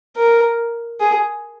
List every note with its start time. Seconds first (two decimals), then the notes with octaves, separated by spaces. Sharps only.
0.17 A#4
1.00 G#4